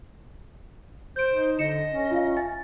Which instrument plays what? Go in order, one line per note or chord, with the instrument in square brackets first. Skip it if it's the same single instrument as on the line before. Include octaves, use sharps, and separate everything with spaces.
[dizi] C5 [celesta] G6 D7
[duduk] D#4
[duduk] D3 [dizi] D#5 [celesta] C#7 E7
[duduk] C#4
[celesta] F4 E5 F5
G#5 A6